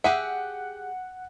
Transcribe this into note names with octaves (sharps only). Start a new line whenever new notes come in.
G4 G#4 E5 F#5